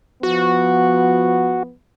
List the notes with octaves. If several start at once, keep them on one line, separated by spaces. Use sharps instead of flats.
F3 B3 F#4